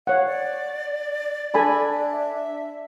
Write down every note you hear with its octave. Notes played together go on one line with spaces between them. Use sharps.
C#5 F5 F#5
D5
D4 A4 G#5 B5
E5